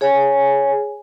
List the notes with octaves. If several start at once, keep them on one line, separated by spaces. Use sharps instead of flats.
G#4 C#5 G#5